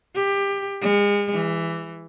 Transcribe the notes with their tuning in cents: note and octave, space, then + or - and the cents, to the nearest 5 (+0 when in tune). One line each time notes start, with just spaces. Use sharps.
G4 +20
G#3 -35
E3 +10